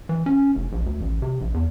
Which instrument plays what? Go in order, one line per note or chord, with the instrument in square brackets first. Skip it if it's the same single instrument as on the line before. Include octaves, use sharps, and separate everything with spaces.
[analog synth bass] E3
C#4
F1
A#1
D2
A1
C3
A#1
E2